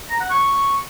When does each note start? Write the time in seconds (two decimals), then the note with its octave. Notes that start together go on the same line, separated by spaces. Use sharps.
0.10 A#5
0.20 F#5
0.30 C#6